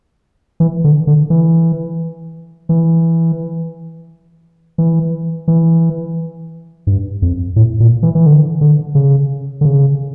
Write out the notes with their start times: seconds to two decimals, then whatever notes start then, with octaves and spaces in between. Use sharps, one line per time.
0.60 E3
0.84 D3
1.07 D3
1.30 E3
2.69 E3
4.78 E3
5.48 E3
6.87 G2
7.22 F2
7.56 A2
7.80 A#2
8.03 E3
8.15 E3
8.26 D3
8.61 D3
8.95 C#3
9.61 D3
9.65 C#3